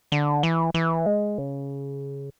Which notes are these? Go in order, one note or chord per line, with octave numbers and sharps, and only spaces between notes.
D3
E3
E3
G#3
C#3